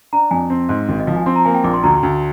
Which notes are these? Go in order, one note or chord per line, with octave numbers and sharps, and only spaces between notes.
D4 A#5
F2 G#5
C4
G#2
G#1
D#5
F3 F5
G#5
C4 C6
A#5
A#3 G#5
G5
A#1 D6
C6
D2 A#5
D2